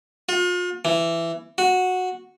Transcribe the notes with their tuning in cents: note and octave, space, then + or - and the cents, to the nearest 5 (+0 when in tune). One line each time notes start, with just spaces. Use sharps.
F4 +40
E3 +15
F#4 -10